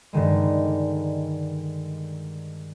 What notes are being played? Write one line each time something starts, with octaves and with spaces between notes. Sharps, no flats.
G2 D3 D#3 G#3